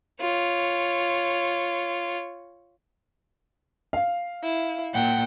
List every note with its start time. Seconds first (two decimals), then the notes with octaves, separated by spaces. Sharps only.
0.21 F4 C#5
3.93 F5
4.42 E4
4.93 A#2 F#5 G5